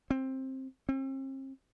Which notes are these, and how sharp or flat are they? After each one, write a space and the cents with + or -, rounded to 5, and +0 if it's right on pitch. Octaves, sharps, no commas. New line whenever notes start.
C4 +15
C4 +40